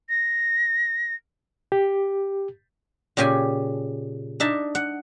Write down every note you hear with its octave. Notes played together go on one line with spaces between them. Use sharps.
A#6
G4
A#2 C#3 G4 G5 G#5
D4 D#4 E5 A5
F#5